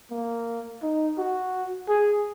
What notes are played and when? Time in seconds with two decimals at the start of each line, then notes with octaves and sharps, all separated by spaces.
0.11 A#3
0.83 D#4
1.18 F#4
1.89 G#4